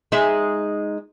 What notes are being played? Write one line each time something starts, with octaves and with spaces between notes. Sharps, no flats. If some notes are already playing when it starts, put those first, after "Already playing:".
G#3 D#4 E5